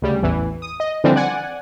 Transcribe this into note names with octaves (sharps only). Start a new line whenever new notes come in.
D2 C#3 G3
A1 E2 E3
D#6
D#5
D3 E3 F3 G3 C4
D5 F#5 G#5